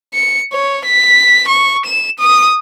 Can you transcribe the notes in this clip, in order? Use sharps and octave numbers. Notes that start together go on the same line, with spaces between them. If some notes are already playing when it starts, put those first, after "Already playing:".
C#7
C#5
B6
C#6
E7
D#6